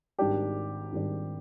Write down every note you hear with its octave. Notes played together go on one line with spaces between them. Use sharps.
G#1 G#2 D#3 G3 D4 G4
G#1 G#2 D#3 G3 D4